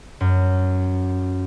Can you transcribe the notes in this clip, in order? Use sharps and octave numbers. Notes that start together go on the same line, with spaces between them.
F#2